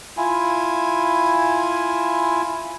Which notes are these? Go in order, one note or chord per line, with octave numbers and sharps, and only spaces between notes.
E4 F4 G#5